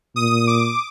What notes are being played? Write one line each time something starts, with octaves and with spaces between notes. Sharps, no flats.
A#2 D#6
D6